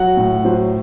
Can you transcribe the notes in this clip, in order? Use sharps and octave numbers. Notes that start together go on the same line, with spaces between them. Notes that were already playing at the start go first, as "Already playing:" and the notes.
Already playing: F#3 F#5
A2
F#3 C5